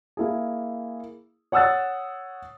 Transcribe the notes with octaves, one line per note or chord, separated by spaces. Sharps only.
A#3 E4 G#4
C#5 F#5 D#6 E6 F#6 A6